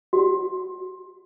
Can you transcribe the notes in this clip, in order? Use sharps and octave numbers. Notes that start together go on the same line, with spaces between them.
F#4